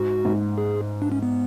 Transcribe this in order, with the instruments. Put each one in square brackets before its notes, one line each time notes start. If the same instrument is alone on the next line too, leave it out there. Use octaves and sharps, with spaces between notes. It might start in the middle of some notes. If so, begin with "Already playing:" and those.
Already playing: [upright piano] G#2 [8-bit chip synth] F#4
[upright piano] G#2
[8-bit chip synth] G#4
D4
C#4
B3